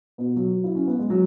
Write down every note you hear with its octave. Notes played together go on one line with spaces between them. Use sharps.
B2 B3
F#3
E4
C#4
B3
G#3
F#3